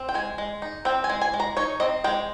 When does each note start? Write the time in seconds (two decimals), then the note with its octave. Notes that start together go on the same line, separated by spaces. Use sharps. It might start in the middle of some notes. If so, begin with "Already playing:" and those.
Already playing: C4
0.09 G5
0.14 G#3 G#5
0.38 G#3
0.62 D#4
0.85 C4 G5
1.04 G#5
1.10 G#3
1.22 G#5
1.34 G#3
1.40 A#5
1.57 D#4 C#5
1.80 C4 D#5
2.04 G#3 G5